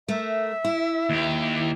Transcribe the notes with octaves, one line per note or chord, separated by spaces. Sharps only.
A3 A#4 E5
E4
D#2 G4